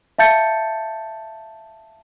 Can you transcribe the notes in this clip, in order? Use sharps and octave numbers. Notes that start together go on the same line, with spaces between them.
E5 F5 A5 G6 A6 C#7